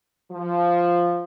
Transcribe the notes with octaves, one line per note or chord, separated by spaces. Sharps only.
F3